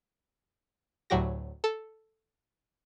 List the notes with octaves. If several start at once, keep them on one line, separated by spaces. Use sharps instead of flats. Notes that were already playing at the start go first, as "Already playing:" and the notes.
D2 A2 F#3 F#4 G4 A#6
A4